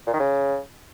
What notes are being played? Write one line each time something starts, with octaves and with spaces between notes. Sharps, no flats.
A#2
D#3
C#3